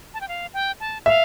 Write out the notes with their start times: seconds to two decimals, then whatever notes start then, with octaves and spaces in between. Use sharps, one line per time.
0.14 A5
0.21 G5
0.28 F5
0.54 G5
0.80 A5
1.06 E5 F5